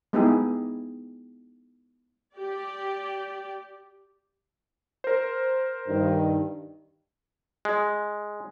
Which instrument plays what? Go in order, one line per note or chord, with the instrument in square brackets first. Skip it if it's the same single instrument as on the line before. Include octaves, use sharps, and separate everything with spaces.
[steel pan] G#3 B3 D#4 E4 G4 G#4
[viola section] G4 D5
[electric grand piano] A#4 C5
[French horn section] G2 D#3
[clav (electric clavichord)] G#3